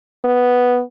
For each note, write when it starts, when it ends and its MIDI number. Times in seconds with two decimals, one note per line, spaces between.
0.24 0.81 59